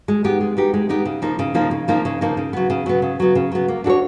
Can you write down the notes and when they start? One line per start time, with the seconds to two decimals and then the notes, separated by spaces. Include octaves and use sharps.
0.08 G#3
0.24 B3 D#4 G4
0.41 G#3
0.57 B3 D#4 G4
0.74 G#3
0.89 B3 D#4 G4
1.05 C#3
1.22 F3 A#3 D#4
1.39 C#3
1.55 F3 A#3 D#4
1.71 C#3
1.88 F3 A#3 D#4
2.05 C#3
2.21 F3 A#3 D#4
2.37 C#3
2.53 F#3 B3
2.70 C#3
2.86 F#3 B3
3.02 C#3
3.20 F#3 B3
3.35 C#3
3.52 F#3 B3
3.68 A#3
3.84 D4 F#4 A4
3.90 C#5